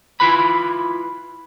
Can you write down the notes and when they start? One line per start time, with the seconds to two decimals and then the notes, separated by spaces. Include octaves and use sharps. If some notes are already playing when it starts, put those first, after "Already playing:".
0.20 E4 F4 B4 B5